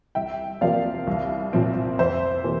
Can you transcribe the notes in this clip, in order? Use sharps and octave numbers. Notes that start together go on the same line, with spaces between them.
C2 E5 G5
C3 F3 A#3 D5 F5
C2
A#2 F3 C4
F2 C5 E5
C3 E3 A#3